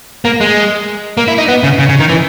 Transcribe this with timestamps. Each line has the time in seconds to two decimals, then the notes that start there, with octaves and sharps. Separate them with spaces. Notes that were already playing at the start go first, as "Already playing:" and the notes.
0.25 A#3
0.41 G#3
1.17 A#3
1.28 E4
1.38 D#4
1.48 B3
1.63 C#3
1.79 C#3
1.89 C#3
1.99 D#3
2.09 E3